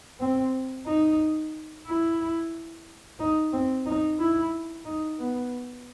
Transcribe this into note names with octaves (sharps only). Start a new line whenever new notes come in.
C4
D#4
E4
D#4
C4
D#4
E4
D#4
B3